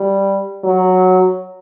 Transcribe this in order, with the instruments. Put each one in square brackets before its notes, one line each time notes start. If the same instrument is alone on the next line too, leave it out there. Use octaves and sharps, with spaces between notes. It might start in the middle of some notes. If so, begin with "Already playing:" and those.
Already playing: [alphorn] G3
F#3